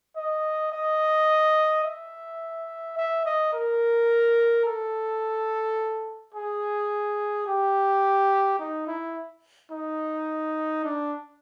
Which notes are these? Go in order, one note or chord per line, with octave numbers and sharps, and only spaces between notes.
D#5
D#5
E5
E5
D#5
A#4
A4
G#4
G4
D#4
E4
D#4
D4